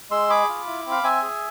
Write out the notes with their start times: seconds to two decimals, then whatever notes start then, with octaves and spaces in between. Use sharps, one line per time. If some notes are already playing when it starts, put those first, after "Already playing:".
0.11 G#3 C6 E6
0.30 G#4 B5 D6
0.49 F4
0.67 E4
0.86 C4
0.91 F5
1.03 C4 E5 G#5
1.22 G#4